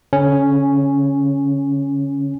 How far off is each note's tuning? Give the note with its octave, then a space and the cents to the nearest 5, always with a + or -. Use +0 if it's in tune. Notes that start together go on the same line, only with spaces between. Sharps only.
D3 -40 C#4 +0